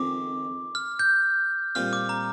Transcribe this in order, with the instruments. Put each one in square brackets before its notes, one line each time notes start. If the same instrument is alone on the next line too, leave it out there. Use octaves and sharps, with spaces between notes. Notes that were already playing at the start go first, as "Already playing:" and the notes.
Already playing: [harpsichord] F2 D#3 G#3 C4 [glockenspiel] D6
[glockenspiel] F6
G6
[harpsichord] A#2 G3 C4 F4 [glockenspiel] F6
[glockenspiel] D6
A#5